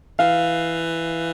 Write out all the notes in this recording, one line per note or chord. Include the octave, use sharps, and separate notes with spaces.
E3 F5